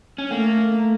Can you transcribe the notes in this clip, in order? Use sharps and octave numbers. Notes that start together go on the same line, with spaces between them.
C#4
A3 A#3